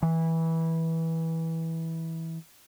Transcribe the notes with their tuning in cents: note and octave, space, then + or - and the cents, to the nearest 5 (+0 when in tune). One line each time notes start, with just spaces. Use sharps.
E3 -15